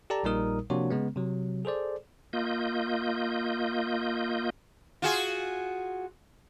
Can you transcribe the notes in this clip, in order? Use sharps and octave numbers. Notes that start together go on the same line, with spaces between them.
G4 A4 D5 A5 A#5
A#1 A#2 G3 D#4 A#4 D#6
C3 F3 A#3 D4 F#4 C#5
C#3 G#3 B3
C3 F#3
G#4 A4 C5 D5
A#3 F4 D#5 G6
F4 F#4 G#4